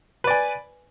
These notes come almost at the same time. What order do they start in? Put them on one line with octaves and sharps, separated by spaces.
B4 D5 G#5